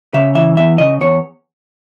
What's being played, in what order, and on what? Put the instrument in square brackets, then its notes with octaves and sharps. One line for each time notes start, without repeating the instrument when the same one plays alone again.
[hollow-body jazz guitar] C#3 E5
E3 E5
E2 E5
C#3 D#5
E2 C#5